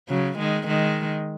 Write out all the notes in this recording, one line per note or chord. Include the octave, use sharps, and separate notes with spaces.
C#3 F#3
D#3 G#3
D#3 G#3